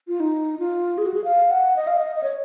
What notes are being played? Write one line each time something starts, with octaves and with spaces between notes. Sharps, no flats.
F4
D#4
F4
G#4
F#4
G#4
F5
F#5
D#5
F5
D#5
D#5
C#5